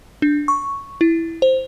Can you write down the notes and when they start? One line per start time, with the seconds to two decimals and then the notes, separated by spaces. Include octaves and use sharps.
0.22 D4
0.48 C#6
1.01 E4
1.42 C5